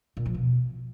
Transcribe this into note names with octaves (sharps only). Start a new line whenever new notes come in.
A#2
F3
B2